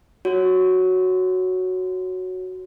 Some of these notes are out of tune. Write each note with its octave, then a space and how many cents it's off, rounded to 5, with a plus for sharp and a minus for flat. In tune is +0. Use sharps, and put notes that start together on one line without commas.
F#4 +0 C#5 +0